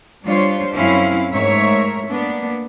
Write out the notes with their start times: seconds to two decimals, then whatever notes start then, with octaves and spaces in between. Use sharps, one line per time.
0.25 G3 D4 F4 C5 C#5
0.75 F#2 C4 C#4 E4 F5
1.32 G#2 A3 A#4 C#5 E5
2.10 A#3 B3 D4